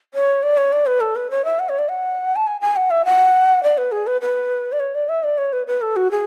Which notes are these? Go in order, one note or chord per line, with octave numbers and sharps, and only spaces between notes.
C#5
D5
C#5
D5
B4
A4
B4
C#5
E5
F#5
C#5
D5
F#5
A5
G#5
G#5
F#5
E5
F#5
D5
B4
G#4
B4
B4
D5
C#5
D5
E5
D5
C#5
B4
B4
A4
F#4
G#4